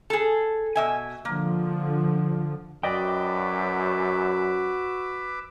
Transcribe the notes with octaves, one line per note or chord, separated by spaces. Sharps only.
G#4 A4
B2 E5 G#5
D3 F3 A#3
F#2 F#4 B4 D5 D#5 G5 D6 E6